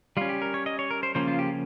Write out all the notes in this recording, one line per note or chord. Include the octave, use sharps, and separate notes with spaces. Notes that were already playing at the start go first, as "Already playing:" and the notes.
G3 C#4 F4
G4
A#4
C#5
D#5
C#5
A#4
C5
C#3 F3 A#3 C#4 C5
F4
G4